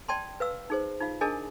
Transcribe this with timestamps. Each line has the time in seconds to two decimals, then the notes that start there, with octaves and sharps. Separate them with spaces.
0.08 D5 G5 A5 C6
0.40 B4 F5 E6
0.70 D#4 G#4 C5
1.00 D#4 F4 F5
1.21 D4 G#4 A#4 D#5 G#5 A5